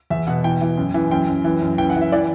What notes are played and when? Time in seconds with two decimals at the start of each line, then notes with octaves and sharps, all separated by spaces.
0.10 E2 E5
0.27 B2 F#5
0.44 E3 G5
0.61 E3
0.77 F#2
0.94 E3
1.11 F#2 G5
1.29 F#2
1.44 E3
1.62 F#2
1.78 E3 G5
1.90 F#5
1.96 E3
2.01 E5
2.12 E3 D5